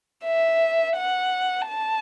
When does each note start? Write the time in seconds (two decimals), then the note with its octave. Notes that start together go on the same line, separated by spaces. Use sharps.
0.24 E5
0.97 F#5
1.69 A5